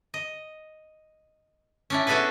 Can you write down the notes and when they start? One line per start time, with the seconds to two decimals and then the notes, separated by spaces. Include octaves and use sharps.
0.14 D#5
1.90 C#4 D4 E4
2.07 B3 E4 F#4 G#4 A4 B4